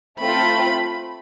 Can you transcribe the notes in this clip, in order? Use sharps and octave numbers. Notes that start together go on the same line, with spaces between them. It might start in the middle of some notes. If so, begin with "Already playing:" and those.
A3 C4 F4 B5